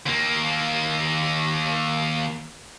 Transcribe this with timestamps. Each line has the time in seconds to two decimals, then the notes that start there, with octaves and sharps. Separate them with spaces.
0.06 D#2 A#3